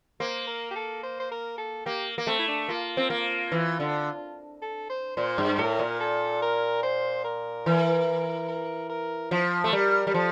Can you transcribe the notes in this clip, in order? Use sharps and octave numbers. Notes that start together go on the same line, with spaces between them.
A#3 C5
A#4
G4
A4
C5
C5
A#4
A4
A#3 G4
A#3
A3 C4
E4
D4
A#3 F4
C4
A#3
E3
D3
A4
C5
A#2 C5
G2
A2 A#4
A#2
A4
A#4
C5
A#4
E3
A#4
A#4
F3 C5
A3
G3 A#4
G3
F3 A4